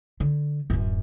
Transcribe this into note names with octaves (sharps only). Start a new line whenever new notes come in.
D3
D1 F#2